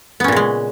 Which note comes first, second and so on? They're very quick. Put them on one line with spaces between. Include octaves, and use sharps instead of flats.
B3 C#4 A#2 C#3 G#3